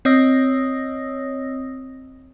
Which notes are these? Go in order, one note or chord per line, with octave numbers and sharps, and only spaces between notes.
C4 C#5 D#5 D#6 E6 A#6